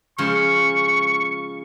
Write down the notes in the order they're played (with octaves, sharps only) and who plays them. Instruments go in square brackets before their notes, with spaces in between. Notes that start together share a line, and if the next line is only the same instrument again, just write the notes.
[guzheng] C#3 F3 G#3 [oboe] C#6